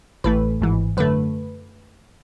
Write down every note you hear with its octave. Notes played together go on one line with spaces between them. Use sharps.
A1 A2 E3 A3 B4
G#1 G#2 E3
F#2 D3 A3 B4